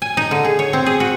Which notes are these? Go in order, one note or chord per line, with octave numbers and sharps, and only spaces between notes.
G#5
D#4
D3
G#4
C#5
C4
G#4
F#4